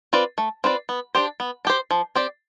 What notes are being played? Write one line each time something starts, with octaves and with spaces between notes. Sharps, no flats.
C4 F4 B4 D5
A3
C4 F4 B4 D5
B3
D4 G4 C5
B3
D4 G4 C5
F3
C4 G4 D5